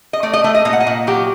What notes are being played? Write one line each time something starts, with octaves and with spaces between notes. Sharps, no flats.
D#5
A3 D5
D#5
A3 D#5
D#5
A#2 D#5
F#5
D#5
A#2
F#3 G4